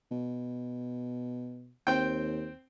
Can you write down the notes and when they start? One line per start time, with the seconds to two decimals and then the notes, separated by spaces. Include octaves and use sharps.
0.11 B2
1.87 D#2 C4 G5